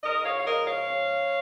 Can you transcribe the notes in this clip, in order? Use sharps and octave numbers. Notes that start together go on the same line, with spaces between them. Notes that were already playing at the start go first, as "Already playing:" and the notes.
G#2 A#4 D#5
C#5 F5
F5
F3 A#4 D#5
C#5 F5
C#4